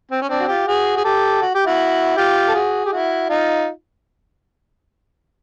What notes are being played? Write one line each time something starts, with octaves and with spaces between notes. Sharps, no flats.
C4
C#4
C4 D4
F#4
F4 G4
F#4 G#4
G#4
G4 A4
F#4
G4
E4 F#4
F4 G4
A4
F#4 G#4
G4
E4 F#4
D#4 F4